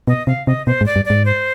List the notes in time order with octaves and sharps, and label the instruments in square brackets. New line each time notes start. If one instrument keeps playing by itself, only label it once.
[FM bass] B2 [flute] D#5
[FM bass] C3 [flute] F5
[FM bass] C3 [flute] D#5
[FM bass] B2 [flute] C5
[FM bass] G#2
[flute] D5
[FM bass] G2
[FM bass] G#2 [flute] D5
[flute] C5